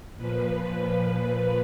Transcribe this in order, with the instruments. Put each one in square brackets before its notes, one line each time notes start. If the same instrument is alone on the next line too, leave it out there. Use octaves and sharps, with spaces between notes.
[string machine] A#2 F3 B4
B4